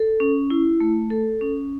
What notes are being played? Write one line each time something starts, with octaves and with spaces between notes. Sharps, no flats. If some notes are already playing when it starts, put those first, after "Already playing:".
Already playing: A4
C#4
E4
A3
A4
C#4